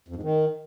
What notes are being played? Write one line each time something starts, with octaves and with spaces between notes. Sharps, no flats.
F2
G#2
D#3